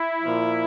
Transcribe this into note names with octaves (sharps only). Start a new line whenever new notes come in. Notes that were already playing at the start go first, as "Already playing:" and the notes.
Already playing: E4
A#2 F3